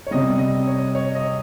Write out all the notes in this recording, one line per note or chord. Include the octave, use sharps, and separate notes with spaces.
C#5
C3 G3 D#5
D#5
C#5
C#5
D#5